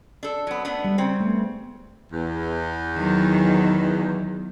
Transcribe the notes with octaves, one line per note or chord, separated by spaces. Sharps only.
D4 A4
F#3 B3
A3 B3 D4
G3
C#3 C4
A3 B3
E2
D#3 F#3